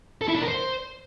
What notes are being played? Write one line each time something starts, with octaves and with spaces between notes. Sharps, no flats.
A4
E4
D4
A#4
C5